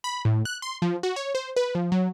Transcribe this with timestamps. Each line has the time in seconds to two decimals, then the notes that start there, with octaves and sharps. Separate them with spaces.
0.04 B5
0.25 A2
0.45 F#6
0.62 C6
0.82 F3
1.03 F#4
1.16 C#5
1.35 C5
1.56 B4
1.75 F3
1.92 F#3